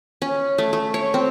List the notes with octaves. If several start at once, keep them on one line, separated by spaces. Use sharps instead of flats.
C#4
A3
A3
C#5
C4